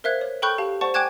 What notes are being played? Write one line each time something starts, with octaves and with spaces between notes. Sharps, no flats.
A#4 C5 E5 F5 F#6 G#6
C#5
A4 G5 B5 C#6 F#6 G6
G4 F5 A5
C5 D5 F#5 A5 C#6
G5 G#5 D6 F#6 G#6 E7